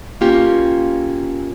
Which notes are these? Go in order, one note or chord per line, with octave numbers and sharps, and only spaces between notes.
A#3 C#4 F4 G4